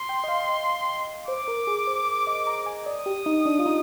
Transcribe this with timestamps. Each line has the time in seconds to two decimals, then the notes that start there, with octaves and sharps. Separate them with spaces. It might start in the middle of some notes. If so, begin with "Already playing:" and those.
Already playing: C6
0.09 G5
0.24 D#5
0.28 F5
0.49 D#5
1.27 C5 D6
1.48 A#4
1.67 G#4
1.87 C5
2.27 D#5
2.47 A#5
2.66 G#5
2.86 D5 D#6
3.06 G4
3.26 D#4
3.46 D4
3.59 F4
3.66 D#4